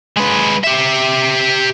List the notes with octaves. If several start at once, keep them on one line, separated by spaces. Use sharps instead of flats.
G#3 B4
G4 E5